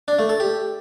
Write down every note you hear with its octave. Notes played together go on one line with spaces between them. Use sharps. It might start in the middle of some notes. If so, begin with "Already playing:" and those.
D4
A3
A4
G4